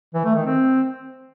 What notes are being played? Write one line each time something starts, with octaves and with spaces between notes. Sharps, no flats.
E3
A3
D#3
C4